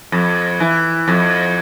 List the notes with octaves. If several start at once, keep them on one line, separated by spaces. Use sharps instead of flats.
F2
E3
F2